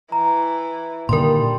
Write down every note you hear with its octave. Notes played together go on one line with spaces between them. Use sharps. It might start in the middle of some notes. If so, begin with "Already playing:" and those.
E3 A#5
A#2 D3 D#3 G3 A#4 C6